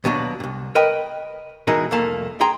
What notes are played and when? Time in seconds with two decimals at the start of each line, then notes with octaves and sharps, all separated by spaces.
0.04 D#2 B2 F#3 D4
0.40 C2 G2
0.75 A#4 B4 D#5 G5 B5
1.67 B2 E3 G#3 D#4 E4 A#4
1.91 C2 F2 A3 A#3 A5
2.40 G#4 G5 A#5 C6